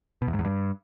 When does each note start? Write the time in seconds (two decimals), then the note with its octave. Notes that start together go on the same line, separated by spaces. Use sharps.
0.22 B2
0.27 E2
0.33 G#2
0.39 E2
0.45 G2